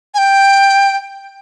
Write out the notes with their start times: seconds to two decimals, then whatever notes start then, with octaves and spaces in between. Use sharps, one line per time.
0.14 G#5
0.18 G5